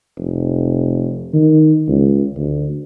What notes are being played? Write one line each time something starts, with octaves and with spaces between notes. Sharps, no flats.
F1
D#3
C#2
D2